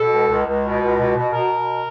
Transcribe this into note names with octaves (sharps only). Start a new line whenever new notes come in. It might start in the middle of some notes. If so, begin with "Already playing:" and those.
Already playing: B2 A4
C#2
C#2
C#2
B2
C#2
B2
B2
B2 A#4
B2